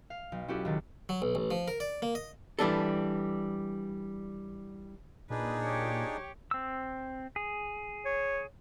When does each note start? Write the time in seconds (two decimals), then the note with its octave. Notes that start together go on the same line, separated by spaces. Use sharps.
0.10 F5
0.32 B1
0.48 C#4 E4 F#4 G4 A4
0.65 C#2 D#3 A6
1.09 F#3
1.22 B1
1.35 A1
1.51 F3
1.68 A#4
1.80 D5
2.02 A#3
2.15 D#5
2.59 E3 G3 D4 A4
5.30 A#2 D4 D#4 G#4 B4
5.65 G4 C#5
6.51 C4 E6
7.36 G#4
8.06 C#5